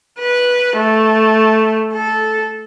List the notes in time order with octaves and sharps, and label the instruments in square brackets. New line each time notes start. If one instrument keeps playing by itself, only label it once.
[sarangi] B4
A3
A4